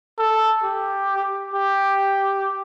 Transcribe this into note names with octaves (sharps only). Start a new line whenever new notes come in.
A4
G4
G4